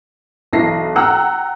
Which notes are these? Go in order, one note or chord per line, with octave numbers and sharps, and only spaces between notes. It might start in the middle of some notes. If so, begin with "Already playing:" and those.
B1 E3 E5 A#6 C7
F#5 G5 A#5 E6 F6